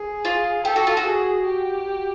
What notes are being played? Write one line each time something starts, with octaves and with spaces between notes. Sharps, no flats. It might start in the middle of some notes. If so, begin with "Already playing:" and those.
Already playing: G#4
F4
G4 A4
F#4
F4
F#4
G#4
G4